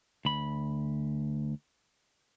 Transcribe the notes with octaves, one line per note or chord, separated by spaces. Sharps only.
D2 B5